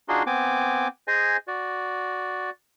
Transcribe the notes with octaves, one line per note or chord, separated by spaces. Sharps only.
D4 D#4 F4 F#4 G#4 C6
B3 C4 G#5 D6
G#4 C5 D#5 G#5
F#4 D5